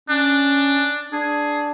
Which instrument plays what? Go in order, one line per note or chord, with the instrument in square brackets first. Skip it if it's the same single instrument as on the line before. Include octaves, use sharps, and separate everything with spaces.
[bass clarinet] C#4 [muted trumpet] D4
[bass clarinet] D4 [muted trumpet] G#4